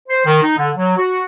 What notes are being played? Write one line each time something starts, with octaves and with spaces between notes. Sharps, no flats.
C5
D#3
D#4
D3
F#3
F#4